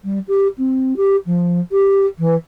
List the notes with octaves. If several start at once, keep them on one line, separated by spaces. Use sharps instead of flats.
G3
G4
C4
G4
F3
G4
E3